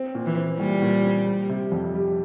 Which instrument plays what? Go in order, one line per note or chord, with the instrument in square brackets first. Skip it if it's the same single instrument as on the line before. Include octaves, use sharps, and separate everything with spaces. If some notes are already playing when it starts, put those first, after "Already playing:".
Already playing: [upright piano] C4
A#2
[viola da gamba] E3
[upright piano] C4
[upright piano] A#2 [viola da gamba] G3
[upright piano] A#2
C4
G3
C3
F2
G3